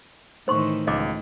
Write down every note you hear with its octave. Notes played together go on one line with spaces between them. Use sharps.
A2 D#3 E3 C5 C6 C#6
C#2 D#5 D6